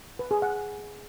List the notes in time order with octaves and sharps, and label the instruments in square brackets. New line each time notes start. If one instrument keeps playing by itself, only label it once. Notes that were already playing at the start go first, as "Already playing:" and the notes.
[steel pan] B4
G#4
F#5